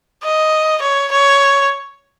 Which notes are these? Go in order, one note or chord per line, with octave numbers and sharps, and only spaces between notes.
D#5
C#5
C#5